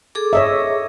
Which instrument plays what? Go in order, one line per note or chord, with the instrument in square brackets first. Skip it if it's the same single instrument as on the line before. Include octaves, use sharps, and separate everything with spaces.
[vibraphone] G#4 A4 D6
[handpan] C#5 D#5 E5